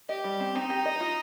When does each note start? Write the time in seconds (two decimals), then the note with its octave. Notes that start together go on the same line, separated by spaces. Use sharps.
0.08 G4 D#5
0.24 G3
0.40 C4
0.55 C4 D#4
0.70 G4
0.86 D#5
1.01 F4